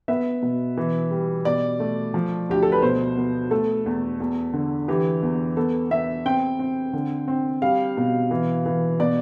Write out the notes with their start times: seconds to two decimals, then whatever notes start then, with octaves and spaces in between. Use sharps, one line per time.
0.08 B3 E5
0.42 B2
0.77 E3
1.11 G3
1.45 B2 D5
1.80 A3
2.14 F3
2.49 D2 G4
2.63 A4
2.72 B4
2.82 B2 C5
3.17 B3
3.51 A3 A4
3.86 E2
4.20 E2
4.53 D3
4.88 E3 G4
5.23 E2
5.57 B3 A4
5.91 B3 E5
6.26 C4 G5
6.59 C4
6.93 D3
7.28 C4
7.62 G3 F5
7.97 B2
8.31 E3
8.66 E3
9.00 B2 D5